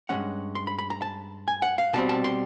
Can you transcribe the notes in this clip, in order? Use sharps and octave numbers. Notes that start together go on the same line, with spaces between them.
G2 E3 G#3 C#4 F#5
C6
B5
B5
A#5
A5
G#5
F#5
F5
B2 G3 C4 A5
A5
C6